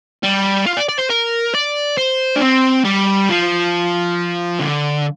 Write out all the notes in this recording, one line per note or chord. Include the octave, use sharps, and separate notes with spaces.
G3
F4
D5
D5
C5
A#4
D5
C5
D4
C4
G3
F3
D3